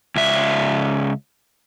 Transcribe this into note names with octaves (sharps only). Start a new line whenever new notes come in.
C#2 E5